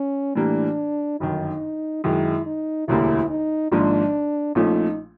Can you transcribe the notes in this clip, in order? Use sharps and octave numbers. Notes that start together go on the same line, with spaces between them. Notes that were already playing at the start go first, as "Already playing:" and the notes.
Already playing: C#4
A2 E3 G3 A#3 D4
G1 F#2 D#3 D#4
F#2 D#3 G#3 E4
D#4
E1 D2 D3 G3 A#3 E4
D#4
G#1 G#2 F3 A#3 D4
A#1 A#2 F3 A3 C#4 D#4